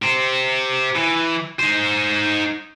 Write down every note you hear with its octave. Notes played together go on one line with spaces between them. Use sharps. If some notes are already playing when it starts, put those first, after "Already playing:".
G4 C5
E3
D#4 C5